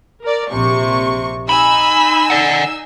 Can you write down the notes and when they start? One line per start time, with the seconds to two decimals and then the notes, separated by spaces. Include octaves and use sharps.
0.22 A#4 D5
0.51 A#1 C3 C#6
1.49 D#4 G#5 B5 E6
2.30 D5 F#5